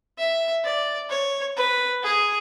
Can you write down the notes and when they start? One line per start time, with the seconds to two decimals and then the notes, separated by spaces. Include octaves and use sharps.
0.18 E5
0.65 D5
1.10 C#5
1.57 B4
2.03 G#4